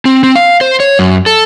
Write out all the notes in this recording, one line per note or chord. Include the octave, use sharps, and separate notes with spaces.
C4
C4
F5
C5
C#5
F#2
A4